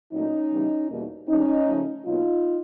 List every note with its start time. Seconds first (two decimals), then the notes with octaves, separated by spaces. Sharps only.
0.13 A#2 F#3 A3 C#4 D#4
0.52 C#3 E3 G3 B3
0.90 E2 B2 G3 A#3
1.28 G#2 D#3 G3 C#4 D#4
1.67 C#3 F3 A3
2.06 B2 F#3 A#3 D#4 F4